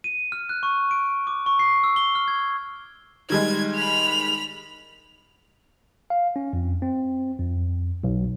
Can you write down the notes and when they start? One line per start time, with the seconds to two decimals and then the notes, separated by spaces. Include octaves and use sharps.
0.04 D#7
0.32 F6
0.49 F#6
0.63 C#6
0.91 D7
1.27 D6
1.46 C#6
1.59 C7
1.84 E6
1.96 G7
2.15 F6
2.28 G#6
3.30 D#3 G3 G#3 G#6
3.74 B5 F7
6.10 F5
6.36 C#4
6.53 F2
6.82 C4
7.39 F2
8.04 B1